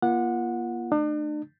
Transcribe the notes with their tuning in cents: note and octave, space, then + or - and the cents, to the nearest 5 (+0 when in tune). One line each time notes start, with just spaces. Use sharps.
A#3 +35 F4 -30 F#5 -15
A3 -5 D4 +40